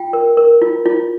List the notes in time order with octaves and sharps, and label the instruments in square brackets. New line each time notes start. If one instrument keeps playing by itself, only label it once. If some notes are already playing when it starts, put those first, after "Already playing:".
Already playing: [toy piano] F4 G5
A#4
A#4
F4
F4